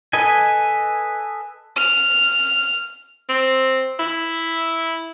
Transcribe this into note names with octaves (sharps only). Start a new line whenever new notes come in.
A4 B4 D#5 G#5
F6
C4
E4